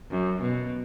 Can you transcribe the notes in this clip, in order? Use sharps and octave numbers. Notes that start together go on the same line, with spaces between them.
F#2
B2